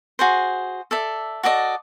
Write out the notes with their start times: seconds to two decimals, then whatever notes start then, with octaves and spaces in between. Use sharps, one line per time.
0.19 F#4 G#4 C5
0.91 A4 D5 E5
1.43 F#4 A4 D5 D#5